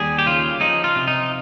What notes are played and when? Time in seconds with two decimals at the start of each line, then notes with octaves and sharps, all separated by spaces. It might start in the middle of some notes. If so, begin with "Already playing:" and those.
Already playing: D#2 G3 G#4
0.19 G4
0.26 C#3 F4
0.61 F3 D#4
0.84 F4
0.96 C3
1.08 D#4